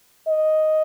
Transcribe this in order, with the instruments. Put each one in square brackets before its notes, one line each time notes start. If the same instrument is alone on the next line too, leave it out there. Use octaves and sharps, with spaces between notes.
[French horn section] D#5